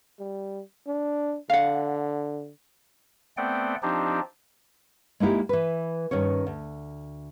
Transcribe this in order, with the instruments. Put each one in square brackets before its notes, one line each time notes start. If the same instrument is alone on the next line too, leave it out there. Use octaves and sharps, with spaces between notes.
[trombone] G3
D4
[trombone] D3 [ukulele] F5 F#5
[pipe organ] A3 B3 C4 D5 F#5 G5
F3 C4 D4 D#4 G4
[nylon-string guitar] G#3 A#3 D#4 E4 G4
E3 B4
G2 D#3 C#4 C#5
D2